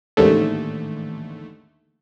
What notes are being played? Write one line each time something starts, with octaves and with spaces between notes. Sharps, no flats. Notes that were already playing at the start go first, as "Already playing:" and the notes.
A1 D#2 G#2 D3 A3